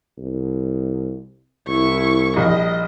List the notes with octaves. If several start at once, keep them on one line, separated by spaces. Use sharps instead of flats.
C2
C2 E4 C#6
A#1 G3 D#5